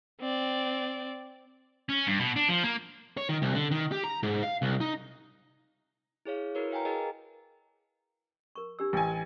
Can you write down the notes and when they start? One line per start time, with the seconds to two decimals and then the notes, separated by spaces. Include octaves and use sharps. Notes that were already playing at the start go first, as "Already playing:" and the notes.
0.21 C4 D5
1.89 C#4
2.07 G2
2.19 B2
2.36 D4
2.49 F3
2.63 A#3
3.17 C#5
3.29 D#3
3.42 C2
3.55 D3
3.71 D#3
3.92 G4
4.04 A#5
4.23 G#2
4.43 F5
4.62 C2
4.81 D#4
6.25 E4 G#4 C#5 F5
6.55 E4 F#4 A#4 B4 C#5
6.71 B4 F5 G5 G#5 A#5
6.85 G#4 A#4 D#5 G#5 A5
8.55 A#4 C#6
8.79 D4 G4 E6
8.93 A1 G#5